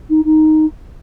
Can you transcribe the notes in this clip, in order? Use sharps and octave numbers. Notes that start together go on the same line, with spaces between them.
D#4
D#4